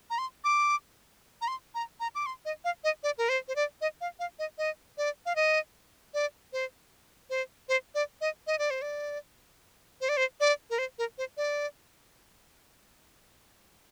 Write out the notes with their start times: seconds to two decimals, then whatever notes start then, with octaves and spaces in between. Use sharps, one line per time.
0.10 A#5
0.18 C6
0.44 D6
1.41 A#5
1.48 C6
1.75 A#5
2.00 A#5
2.15 D6
2.26 C6
2.45 D#5
2.65 F5
2.84 D#5
3.03 D5
3.18 A#4
3.29 C5
3.48 C5
3.56 D5
3.81 D#5
4.01 F5
4.19 F5
4.39 D#5
4.58 D#5
4.98 D5
5.26 F5
5.36 D#5
6.14 D5
6.53 C5
7.30 C5
7.69 C5
7.95 D5
8.21 D#5
8.47 D#5
8.59 D5
8.71 C5
8.82 D5
10.01 C5
10.09 D5
10.17 C5
10.40 D5
10.70 A#4
10.79 C5
10.98 A#4
11.18 C5
11.37 D5